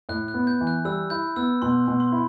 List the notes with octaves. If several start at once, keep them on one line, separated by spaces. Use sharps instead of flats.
A2 F#6
F#6
B3
G6
E3
F#6
G3 E6
E4 G6
B3 E6
B2 C6
B2
C6
E4